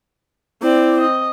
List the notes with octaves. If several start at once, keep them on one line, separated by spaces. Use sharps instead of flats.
C4 E4 D5
D#5